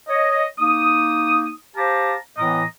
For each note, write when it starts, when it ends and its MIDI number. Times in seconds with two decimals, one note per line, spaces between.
0.08 0.45 73
0.08 0.45 75
0.59 1.51 58
0.59 1.51 63
0.59 1.51 87
1.76 2.15 67
1.76 2.15 72
1.76 2.15 77
1.76 2.15 81
1.76 2.15 82
2.38 2.63 45
2.38 2.63 52
2.38 2.63 59
2.38 2.63 75
2.38 2.63 82